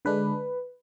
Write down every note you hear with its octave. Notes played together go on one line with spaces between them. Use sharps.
D3 G#3 D4 B4